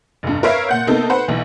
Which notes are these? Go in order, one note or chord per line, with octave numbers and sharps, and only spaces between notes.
F1 G2
A#4 B4 C#5 E5 F5
A#2 F#5 G6
C3 A#3 B3 D#4 A4
B4 C5 F#5
B1 E3